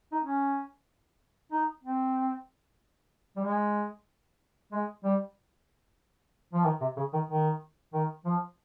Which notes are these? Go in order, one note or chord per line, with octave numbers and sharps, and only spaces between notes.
D#4
C#4
D#4
C4
G3
G#3
G#3
G3
F3
D#3
C3
C#3
D#3
D#3
D#3
F3